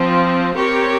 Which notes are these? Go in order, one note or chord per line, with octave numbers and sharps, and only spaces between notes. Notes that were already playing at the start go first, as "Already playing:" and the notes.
Already playing: F3 C4 F4
C4 G4 A#4 C#5